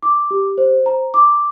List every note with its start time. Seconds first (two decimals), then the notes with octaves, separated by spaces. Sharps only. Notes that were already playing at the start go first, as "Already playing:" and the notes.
0.03 D6
0.31 G4
0.58 C5
0.86 A#5
1.14 D6